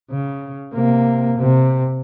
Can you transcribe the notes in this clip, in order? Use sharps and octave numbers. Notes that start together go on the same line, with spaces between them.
C#3
C3 A#3
C3